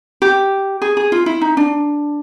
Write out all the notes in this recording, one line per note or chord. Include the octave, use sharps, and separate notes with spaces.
G4
G#4
G#4
F4
E4
D#4
D4